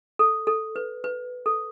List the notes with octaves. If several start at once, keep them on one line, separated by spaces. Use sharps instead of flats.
A4
A4
B4
B4
A4